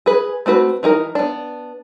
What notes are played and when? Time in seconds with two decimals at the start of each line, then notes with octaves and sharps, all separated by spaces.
0.06 G#4 B4
0.46 A3 C4 F#4 B4
0.83 E3 D#4 G#4 A#4
1.15 B3 D4